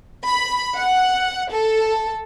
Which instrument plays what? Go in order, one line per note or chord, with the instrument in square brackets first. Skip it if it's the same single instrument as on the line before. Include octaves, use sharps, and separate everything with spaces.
[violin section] B5
F#5
A4